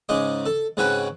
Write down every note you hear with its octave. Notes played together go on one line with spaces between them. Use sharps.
G#2 C#3 G#3 D#5 D6
A4
G#2 C#3 C4 C#4 F#4 B4